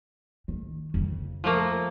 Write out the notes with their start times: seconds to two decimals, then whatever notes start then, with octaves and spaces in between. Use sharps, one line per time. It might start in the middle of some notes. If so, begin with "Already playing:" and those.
0.48 D#3
0.94 F2 C#3
1.44 F3 A3 A#3